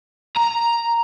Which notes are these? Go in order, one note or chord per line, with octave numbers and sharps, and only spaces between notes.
A#5